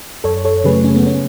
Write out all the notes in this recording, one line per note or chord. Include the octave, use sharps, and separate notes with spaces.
F#2 A4 C#5
A4 C#5
C#3 F#3 A3 G#4 B4
C#4
B3
C#4